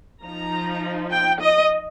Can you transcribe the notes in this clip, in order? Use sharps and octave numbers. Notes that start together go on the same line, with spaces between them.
F3 D#4 A#5
G5
D#5